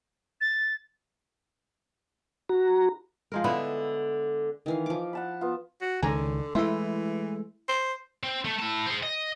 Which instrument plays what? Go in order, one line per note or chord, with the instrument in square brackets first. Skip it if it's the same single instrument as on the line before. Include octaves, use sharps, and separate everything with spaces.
[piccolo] A6
[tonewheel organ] F#4 A#5
[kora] F3 G#3 A#4
[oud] D3 [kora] B3 E4 B4
[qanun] D#3 E3 F5
F3 D6
[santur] F#5 A5 B5
B3 F4
[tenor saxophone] F#4
[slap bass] C#2 D#3 [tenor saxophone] D3 [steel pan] G#5 A#5
[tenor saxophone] E3 [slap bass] G#3 A3 [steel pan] E4 E5 C6
[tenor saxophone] C5
[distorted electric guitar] C4
A3
E4 A5
G#4 C5
D#5